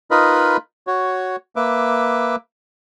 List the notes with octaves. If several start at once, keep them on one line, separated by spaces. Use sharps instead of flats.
D#4 F4 A#4 B4 D#5 B5
F#4 C#5
A#3 B4 E5 D6